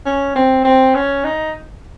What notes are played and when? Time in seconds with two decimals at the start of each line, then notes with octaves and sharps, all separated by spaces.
0.06 C#4
0.36 C4
0.65 C4
0.95 C#4
1.25 D#4